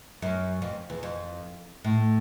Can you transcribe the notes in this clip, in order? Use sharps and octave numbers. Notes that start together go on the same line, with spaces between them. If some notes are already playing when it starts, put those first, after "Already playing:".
F#2
F2
E2
F2
A2